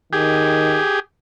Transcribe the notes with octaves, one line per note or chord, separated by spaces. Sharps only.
D#3 G4 G#4